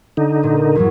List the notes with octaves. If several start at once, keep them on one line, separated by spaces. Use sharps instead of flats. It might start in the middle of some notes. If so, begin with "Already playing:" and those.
D3 D#4
A#2
E2 G2 F#3